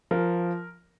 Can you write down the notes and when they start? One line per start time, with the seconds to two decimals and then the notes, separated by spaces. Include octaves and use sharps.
0.11 F3 A#4